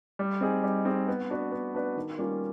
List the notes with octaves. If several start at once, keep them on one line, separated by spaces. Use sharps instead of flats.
G3
C4 D#4 G#4
G3
C4 D#4 G#4
B3
D4 F#4 B4 D5
B3
D4 F#4 B4 D5
D#3
G3 A#3 C#4 F4